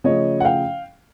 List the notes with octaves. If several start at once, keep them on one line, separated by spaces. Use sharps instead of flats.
C#3 F3 A3 C#5 D#5
F#5
F5 G5